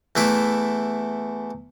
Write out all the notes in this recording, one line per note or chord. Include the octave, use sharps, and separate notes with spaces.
E2 A3 E4 D6